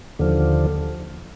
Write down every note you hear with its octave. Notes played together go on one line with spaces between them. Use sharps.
D#2 D3 F3